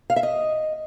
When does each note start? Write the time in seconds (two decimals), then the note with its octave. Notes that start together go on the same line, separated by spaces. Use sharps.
0.10 F5
0.16 E5
0.23 D#5